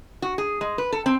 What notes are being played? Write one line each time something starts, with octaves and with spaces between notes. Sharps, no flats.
F#4
G#4
G#3
B4
A4
C4